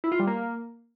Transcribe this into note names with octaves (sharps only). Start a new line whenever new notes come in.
E4
F4
G3
A#3